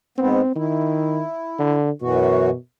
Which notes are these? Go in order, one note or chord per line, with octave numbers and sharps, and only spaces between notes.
G#2 B3 C4
D#3 E4
D3
F#2 B2 E3 F#4